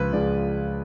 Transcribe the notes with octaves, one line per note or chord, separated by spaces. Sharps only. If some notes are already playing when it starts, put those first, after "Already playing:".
Already playing: C#2 C#3 F3 G#3 B4
C#2 C#3 F3 G#3 D5